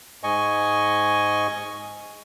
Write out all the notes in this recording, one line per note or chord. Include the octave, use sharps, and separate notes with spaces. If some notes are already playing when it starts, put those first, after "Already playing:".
G#2 D#5 G#5 C#6